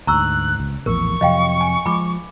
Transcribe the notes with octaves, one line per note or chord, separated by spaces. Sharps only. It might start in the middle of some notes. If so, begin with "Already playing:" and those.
D2 G#2 A#5 C#6 E6 F#6
C#2
A#1 E2 A2 A#4 C#6
F2 C3 F#3 D#5 F5 G5
G#5
F3 G#3 B5 D6